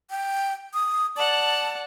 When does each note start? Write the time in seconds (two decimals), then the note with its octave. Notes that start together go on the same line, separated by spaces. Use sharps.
0.10 G5
0.74 D#6
1.17 D5 F#5 A5